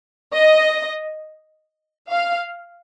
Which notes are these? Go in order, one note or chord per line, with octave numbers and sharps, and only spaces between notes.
D#5
F5